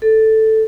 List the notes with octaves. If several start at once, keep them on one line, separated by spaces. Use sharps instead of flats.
A4